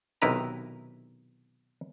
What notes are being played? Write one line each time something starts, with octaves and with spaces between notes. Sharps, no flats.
B1 C3 D#3 E4 B4 A#5